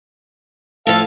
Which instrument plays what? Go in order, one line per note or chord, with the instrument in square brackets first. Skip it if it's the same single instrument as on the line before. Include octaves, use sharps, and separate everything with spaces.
[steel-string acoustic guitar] A2 F3 [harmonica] A4 F5